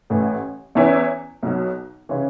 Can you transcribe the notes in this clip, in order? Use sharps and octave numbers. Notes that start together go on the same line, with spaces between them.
A1 A2 E3
E2 E3 C#4 E4
B1 B2 F#3
C#3 E3 C#4